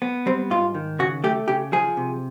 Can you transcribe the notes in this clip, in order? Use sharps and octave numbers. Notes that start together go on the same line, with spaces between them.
B3
G3 C4
G#2 F4
D#3
C#3 F#4
A3 G4
C#3 G4
F3 G#4
C3